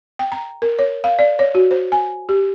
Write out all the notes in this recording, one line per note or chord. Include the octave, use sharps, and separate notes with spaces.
G5
A#5
A#4
C#5
F5
D5
C#5
F#4
C5
G#5
G4